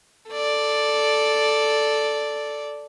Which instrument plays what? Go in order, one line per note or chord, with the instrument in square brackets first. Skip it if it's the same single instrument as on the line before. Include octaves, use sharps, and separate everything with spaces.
[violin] A4 D5